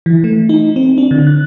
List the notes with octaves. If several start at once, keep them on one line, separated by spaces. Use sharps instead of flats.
E3
A3
D#4
C4
D4
D3
F#6